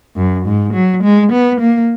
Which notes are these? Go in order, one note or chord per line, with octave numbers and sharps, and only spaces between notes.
F#2
G#2
F#3
G#3
B3
A#3